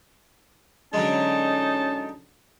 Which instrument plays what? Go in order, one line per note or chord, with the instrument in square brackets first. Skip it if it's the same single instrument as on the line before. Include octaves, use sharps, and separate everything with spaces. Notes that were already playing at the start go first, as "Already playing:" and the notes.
[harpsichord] D3 F#3 G#3 [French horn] C#4 [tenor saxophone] D#4 [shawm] A5